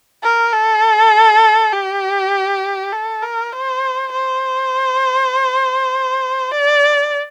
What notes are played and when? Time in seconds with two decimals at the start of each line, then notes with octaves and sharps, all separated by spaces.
0.23 A#4
0.53 A4
1.73 G4
2.92 A4
3.22 A#4
3.52 C5
4.12 C5
6.51 D5